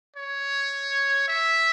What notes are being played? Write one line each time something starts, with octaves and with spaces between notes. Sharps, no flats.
C#5
E5